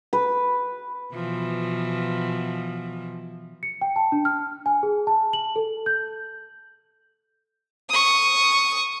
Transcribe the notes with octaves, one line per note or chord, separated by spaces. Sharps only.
B4
B2 E3 F3
C#7
G5
A5
D4
F6
G#5
G#4
A5
F#7
A4
G6
C#6 D#6